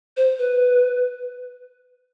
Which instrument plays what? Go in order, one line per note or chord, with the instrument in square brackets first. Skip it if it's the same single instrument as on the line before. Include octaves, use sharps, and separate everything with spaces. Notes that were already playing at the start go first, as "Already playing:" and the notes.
[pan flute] C5
B4